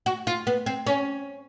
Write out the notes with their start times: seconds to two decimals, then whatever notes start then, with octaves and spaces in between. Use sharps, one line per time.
0.06 F#4
0.27 F4
0.47 B3
0.66 C4
0.87 C#4